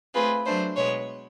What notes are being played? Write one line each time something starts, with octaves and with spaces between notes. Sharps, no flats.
A3 C4 F4 G#4 B4
F#3 A3 D4 C5
B2 G#3 B3 C#5